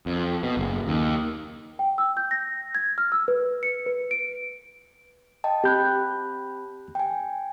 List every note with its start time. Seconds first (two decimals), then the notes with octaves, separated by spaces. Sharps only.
0.06 F2
0.43 B2
0.57 F#1
0.87 D#2
1.79 G5
1.98 E6
2.17 G6
2.31 A#6
2.75 G#6
2.98 F6
3.12 E6
3.28 B4
3.63 C#7
3.86 B4
4.11 D7
5.44 D#5 G5 A5
5.64 C4 G4 B5 F#6 G6
6.95 G5 G#5